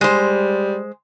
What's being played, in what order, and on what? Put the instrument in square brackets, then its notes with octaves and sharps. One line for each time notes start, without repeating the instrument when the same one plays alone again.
[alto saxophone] G3 [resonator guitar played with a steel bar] G#3 C5